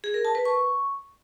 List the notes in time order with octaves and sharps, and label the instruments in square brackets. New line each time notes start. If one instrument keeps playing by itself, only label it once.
[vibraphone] G#4
A#4
A5
B4
C#6